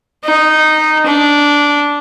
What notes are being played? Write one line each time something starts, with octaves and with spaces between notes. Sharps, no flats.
D#4
D4